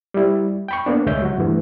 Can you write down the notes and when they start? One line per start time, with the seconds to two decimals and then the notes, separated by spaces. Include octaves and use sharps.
0.14 G3 E4
0.68 G5 B5 C#6
0.86 A#3 B3 D4
1.06 C#2 G#3 C#5 E5 G6
1.22 F#3 F#4
1.38 G2 E3 A3